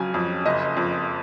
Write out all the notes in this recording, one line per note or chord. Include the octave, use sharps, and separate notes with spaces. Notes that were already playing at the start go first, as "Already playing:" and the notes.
Already playing: F2 C#3 F#3 G#5
F2
F#1 D#5
F2